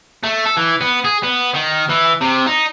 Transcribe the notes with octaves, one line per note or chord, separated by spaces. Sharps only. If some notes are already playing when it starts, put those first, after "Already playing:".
A3
A4
E3
B3
G#4
B3
D#3
E3
C3
D#4